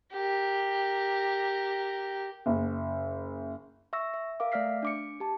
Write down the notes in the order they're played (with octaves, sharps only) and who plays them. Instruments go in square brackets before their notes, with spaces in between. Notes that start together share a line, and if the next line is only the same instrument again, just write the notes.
[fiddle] G4 A#4
[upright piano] F#1
[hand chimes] E5 C#6 E6 A#6
E5
A#4 F5 D6
A3 D5 E5 F6 B6 C7
D4 D6 C#7
G4 A5